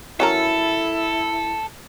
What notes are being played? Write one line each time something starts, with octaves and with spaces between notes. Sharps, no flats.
F#3 C#4 E4 A4 A#4